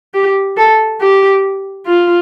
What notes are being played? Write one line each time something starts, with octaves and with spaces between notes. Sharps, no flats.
G4
A4
G4
F4